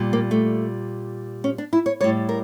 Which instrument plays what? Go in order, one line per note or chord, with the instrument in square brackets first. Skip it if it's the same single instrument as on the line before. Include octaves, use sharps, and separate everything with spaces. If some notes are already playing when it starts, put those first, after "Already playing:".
Already playing: [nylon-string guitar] A#2 G3
A#3
A3
C#4
D4
E4
C#5
A2 G3 C#5
A#4